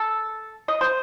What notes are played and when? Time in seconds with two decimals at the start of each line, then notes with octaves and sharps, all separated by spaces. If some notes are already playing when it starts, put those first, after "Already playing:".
Already playing: A4
0.68 D#5
0.81 C5